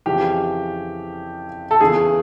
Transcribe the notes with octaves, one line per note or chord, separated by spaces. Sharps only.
F2 C#3 E3 G4
A4
E2 C#3 E3 G#4